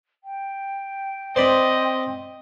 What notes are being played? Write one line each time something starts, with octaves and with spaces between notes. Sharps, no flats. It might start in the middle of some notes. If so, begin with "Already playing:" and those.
G5
C4 C5 D5 D#5 B5